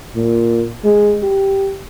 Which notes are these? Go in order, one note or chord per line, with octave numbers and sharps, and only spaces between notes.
A#2
G#3
G4